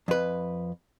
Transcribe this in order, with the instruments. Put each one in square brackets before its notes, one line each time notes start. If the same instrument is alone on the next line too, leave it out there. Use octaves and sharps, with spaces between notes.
[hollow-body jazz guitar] F2 B4